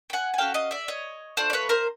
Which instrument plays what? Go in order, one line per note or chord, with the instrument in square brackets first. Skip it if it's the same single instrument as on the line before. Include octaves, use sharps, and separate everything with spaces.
[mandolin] G5
F#5 G#5
G#5
C#4 F#4 A4 F5 G5
D#5 F5
D5 E5
C#5 D#5
A3 D4 F4 A4 C5 D5
D5
B4 C#5
A#4 C5